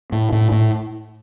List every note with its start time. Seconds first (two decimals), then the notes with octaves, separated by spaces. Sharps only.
0.12 A2
0.32 A2
0.52 A2